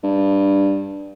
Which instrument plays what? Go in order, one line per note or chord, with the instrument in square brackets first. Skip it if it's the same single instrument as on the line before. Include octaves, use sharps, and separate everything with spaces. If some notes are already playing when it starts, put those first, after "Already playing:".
[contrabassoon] G2